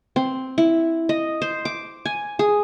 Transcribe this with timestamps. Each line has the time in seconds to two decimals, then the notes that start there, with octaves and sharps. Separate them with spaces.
0.16 C4
0.58 E4
1.09 D#5
1.42 C5
1.65 D6
2.05 G#5
2.39 G#4